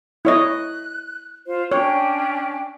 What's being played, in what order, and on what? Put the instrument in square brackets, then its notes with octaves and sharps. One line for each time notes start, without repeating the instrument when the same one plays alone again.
[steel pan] E4 C#5 D#5 [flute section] F#6
[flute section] F4 C5
[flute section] C#4 D4 G5 [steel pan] C#5